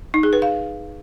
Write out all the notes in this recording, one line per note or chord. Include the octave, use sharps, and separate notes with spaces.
D#4
G#4
B4
F5